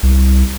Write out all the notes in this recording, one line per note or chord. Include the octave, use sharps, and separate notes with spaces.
C2